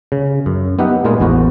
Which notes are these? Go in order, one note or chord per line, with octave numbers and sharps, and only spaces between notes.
C#3
F#2
B3 D#4 G4 E5 F#5
A#2 G#3 A#3 B3 F4
A1 E2 B3 F#4 C5